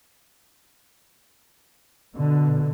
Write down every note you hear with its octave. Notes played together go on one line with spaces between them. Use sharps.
B2 D3